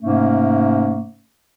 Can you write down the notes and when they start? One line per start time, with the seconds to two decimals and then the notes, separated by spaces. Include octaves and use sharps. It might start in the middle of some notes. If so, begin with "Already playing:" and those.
0.03 G#2 C3 A3 A#3 C#4